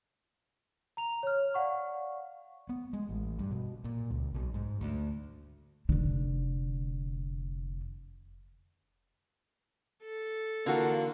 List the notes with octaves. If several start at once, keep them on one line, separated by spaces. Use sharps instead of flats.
A#5 F7
C#5 F6
D5 F5 F#5 C#6
B3
G#3
A1
G2
B2
A#2
C#2
B1
G#2
D2
F1 D3
A4
D3 E3 A#3 F4 F#4